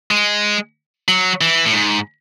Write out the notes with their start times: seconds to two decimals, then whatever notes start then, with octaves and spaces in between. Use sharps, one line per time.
0.11 G#3
1.08 F#3
1.41 E3
1.65 A2
1.73 G#2